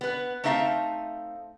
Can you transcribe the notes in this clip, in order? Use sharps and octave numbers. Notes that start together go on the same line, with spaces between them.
B3 B4
A3 C4 D#4 E5 F5 A5